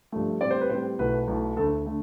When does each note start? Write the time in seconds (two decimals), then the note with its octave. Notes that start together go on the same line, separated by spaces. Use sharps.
0.12 G2 F3 A3
0.41 A2 G3 C4 D5
0.51 C5
0.61 B4
0.70 A2 G3 C4 C5
0.99 B1 B2 A3 E4 B4
1.27 B1 B2 A3 E4
1.56 D2 D3 A3 A4
1.86 D3 A3